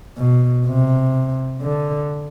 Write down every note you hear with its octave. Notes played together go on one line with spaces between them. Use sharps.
B2
C3
D3